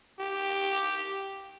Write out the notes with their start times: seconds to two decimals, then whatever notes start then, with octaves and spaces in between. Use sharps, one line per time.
0.20 G4